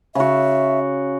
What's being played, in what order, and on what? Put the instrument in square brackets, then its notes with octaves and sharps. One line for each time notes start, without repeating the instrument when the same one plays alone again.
[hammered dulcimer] C#3 F#4 [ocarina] E5